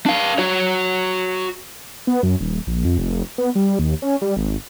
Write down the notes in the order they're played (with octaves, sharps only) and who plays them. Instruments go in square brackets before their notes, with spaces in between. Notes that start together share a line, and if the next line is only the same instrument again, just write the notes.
[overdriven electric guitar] D4 F5
F#4 C#5
[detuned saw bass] B3
F#2
D#1
A#1
F2
F1
B3
G3
D#2
C#4
G3
G#1